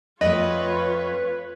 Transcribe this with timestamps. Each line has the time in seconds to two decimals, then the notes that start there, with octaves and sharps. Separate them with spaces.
0.21 F2 A3 F4 B4 C#5 D#5